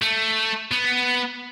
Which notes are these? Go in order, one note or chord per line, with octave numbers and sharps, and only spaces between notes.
A3
B3